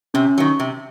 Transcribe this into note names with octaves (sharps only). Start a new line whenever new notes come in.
C3 C#4
D#3 F#3
C3